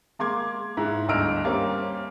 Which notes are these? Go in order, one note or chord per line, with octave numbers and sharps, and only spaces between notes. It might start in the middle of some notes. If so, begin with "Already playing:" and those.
G#3 A#3 C6 D6 G#6
G#2 E4 F#6
G1 D2 D#5 E6 F6 D7
G3 A#3 C4 C#4